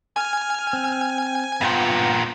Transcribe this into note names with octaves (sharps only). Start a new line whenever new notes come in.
G#5 F6
C4
G2 A#2 B3 F4 F#5 G5